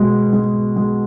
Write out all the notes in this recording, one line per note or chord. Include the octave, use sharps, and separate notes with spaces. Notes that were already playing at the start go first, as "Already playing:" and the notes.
Already playing: B2 G#3
G#3
G#3